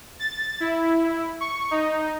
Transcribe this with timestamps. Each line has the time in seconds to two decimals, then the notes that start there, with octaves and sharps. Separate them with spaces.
0.19 A6
0.60 E4
1.41 C#6
1.71 D#4